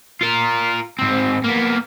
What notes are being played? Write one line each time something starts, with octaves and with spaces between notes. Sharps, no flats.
F4 A#4
G#2 C4
A#3 B3